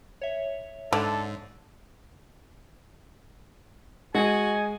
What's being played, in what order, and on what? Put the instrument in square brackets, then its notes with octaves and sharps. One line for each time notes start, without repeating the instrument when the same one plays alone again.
[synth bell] C#5 E5
[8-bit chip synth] G#2 [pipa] D3 [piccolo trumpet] A4
[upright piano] G#3 [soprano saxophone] F#4 [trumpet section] D#5 G#5